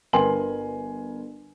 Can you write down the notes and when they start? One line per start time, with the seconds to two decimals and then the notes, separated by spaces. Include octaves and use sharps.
0.13 G1 A#4 B4 G#5 C6 F#7